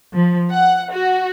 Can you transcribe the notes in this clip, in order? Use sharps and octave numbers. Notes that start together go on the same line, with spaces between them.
F3
F#5
F#4